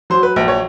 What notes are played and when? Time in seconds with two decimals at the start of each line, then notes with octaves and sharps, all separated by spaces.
0.10 F#3 C5
0.23 B4
0.36 A#1
0.48 C#5